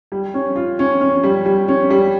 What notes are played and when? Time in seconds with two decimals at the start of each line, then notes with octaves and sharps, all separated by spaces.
0.12 G3
0.34 C#4
0.56 F4
0.79 C#4
1.01 C#4
1.23 G3
1.46 G3
1.68 C#4
1.90 G3